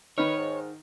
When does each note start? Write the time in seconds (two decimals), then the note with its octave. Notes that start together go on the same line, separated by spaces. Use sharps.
0.18 D#3 D#4 B4 C#5 F6
0.36 G#2